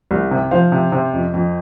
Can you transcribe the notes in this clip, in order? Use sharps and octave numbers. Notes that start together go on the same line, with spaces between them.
C2
C3
F3 C5 F5
C3
C3
F2
F2